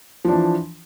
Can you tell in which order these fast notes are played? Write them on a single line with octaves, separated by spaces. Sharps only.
F3 D4 E3